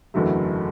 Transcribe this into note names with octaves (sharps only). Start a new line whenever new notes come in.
F#1 E2 D3 F#3 A3